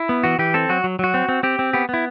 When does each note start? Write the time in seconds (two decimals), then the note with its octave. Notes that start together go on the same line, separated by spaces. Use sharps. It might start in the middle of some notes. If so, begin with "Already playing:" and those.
Already playing: E4
0.09 B3
0.24 E3 F#4
0.39 E3 G4
0.54 C4 A4
0.69 F#3 F#4
0.84 F#3
0.99 F#3 F#4
1.14 C4
1.29 C4
1.43 C4 G4
1.59 C4
1.73 B3 G4
1.89 B3 E4